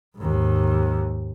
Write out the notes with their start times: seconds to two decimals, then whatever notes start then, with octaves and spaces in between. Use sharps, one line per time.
0.17 D#2 G#2